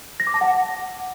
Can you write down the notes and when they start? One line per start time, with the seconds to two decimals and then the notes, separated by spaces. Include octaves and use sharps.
0.20 A#6
0.27 D6
0.34 A5
0.41 F#5